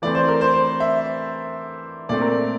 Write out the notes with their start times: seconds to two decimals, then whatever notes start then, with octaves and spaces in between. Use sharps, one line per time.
0.02 E3 A3 C4 D5
0.15 C5
0.28 A#4
0.41 C5
0.54 C5
0.80 E5
2.09 A#2 A3 C4 D5
2.22 A#4